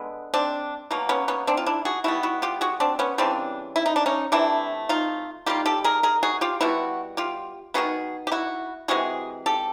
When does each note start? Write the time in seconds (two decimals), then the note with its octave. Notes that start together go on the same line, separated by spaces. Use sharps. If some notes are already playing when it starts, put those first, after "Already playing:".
Already playing: D3 G#3 B3
0.34 C4 D4
0.91 B2 F#3 A#3
1.09 B3 C#4
1.28 B3 C#4
1.47 C4 D4
1.57 F4
1.66 D4 E4
1.85 F#4 G#4
2.04 B2 G3 B3 E4 F#4
2.23 E4 F#4
2.42 F4 G4
2.61 F#4 G#4
2.80 C4 D4
2.99 B3 C#4
3.18 C#3 E3 G3 C4 D4
3.76 E4
3.86 D#4
3.96 D4
4.06 C#4 D#4
4.32 C3 E3 A3 D4 E4
4.89 D#4 F4
5.46 D#3 G3 A#3 F4 G4
5.66 G4 A4
5.84 G#4 A#4
6.03 G#4 A#4
6.23 F#4 G#4
6.41 F4 G4
6.60 B2 G3 B3 E4 F#4
7.17 F4 G4
7.74 D#3 F#3 B3 F#4 G#4
8.27 G4
8.32 E4 F#4
8.88 C3 E3 G#3 F#4 G#4
9.46 G4 A4